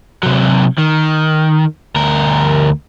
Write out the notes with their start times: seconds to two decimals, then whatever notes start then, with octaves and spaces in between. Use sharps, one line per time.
0.23 C3 F#3
0.78 D#3
1.96 D2 A#4